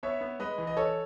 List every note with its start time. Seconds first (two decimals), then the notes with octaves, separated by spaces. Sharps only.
0.03 B3 C#5 E5
0.21 B3
0.39 G#3 B4 D#5
0.58 E3
0.67 D#5
0.77 E3 A4 C#5